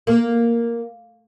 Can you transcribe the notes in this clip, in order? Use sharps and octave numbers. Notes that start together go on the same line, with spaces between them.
A#3